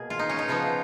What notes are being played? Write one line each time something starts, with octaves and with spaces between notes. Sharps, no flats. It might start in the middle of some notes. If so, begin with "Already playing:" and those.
Already playing: B2 A#3 G#4
F4
D#4
C#4
D#4
C#3 F3 B3 F4